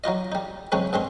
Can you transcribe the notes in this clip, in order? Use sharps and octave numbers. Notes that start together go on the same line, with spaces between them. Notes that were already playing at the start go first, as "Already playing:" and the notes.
F#3 D#4 F4 D#5
G3 D#4
F#2 C#3 G#3 C4 C#4 D#4
G2 G#3 C4 C6